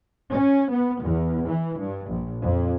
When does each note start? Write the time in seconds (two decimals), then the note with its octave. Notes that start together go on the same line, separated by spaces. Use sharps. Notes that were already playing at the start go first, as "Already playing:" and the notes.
0.30 C#4
0.70 B3
1.02 E2
1.47 E3
1.79 G2
2.09 A#1
2.43 F2